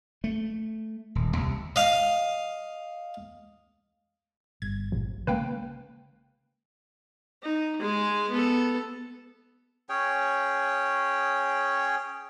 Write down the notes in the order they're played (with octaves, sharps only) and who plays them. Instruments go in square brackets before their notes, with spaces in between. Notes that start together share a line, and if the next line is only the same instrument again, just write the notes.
[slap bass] A3
D#1
C2 C3
[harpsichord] D#5 F5
[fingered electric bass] G1 [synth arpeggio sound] G#6
[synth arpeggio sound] A#1
[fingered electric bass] C#3 G#3 A#3 [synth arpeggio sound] B4 F5 G5
[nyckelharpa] D#4
G#3 G#4
B3 A4
[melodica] C#4 G#4 C#5 G5